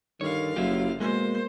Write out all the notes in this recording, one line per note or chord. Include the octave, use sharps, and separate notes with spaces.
G2 D3 D#3 C#5 F5
F#1 F#3 E4 F4 G4
B2 G#3 A#3 C5